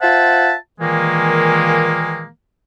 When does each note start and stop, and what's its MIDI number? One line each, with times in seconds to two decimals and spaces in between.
0.01 0.53 65
0.01 0.53 72
0.01 0.53 76
0.01 0.53 78
0.01 0.53 81
0.80 2.27 46
0.80 2.27 51
0.80 2.27 52
0.80 2.27 56
0.80 2.27 58